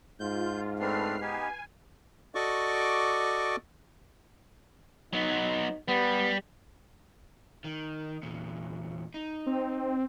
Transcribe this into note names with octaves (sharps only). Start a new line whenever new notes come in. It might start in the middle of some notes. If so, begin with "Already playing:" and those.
G#2 F4 G6
A3 C4 D4 B4 F6 C7
B3 D#4 G4 G#5
F#4 A4 D5 D#5 C#6 D6
F#3 B3 D#4
G3 B3
D#3
E2 A#2
D#4
C4